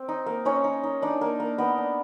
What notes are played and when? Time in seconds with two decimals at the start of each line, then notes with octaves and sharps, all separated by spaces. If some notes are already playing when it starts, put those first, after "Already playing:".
Already playing: C4
0.09 D#4
0.26 A#3
0.45 C#4 D#4 C#5
0.64 D#4
0.83 D#4
1.02 D4 D#4 D5
1.21 A#3
1.40 A#3
1.58 B3 D#4 D#5
1.78 D4